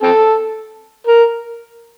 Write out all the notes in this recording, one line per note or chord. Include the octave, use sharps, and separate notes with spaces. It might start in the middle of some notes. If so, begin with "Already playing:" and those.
C4 A4
A#4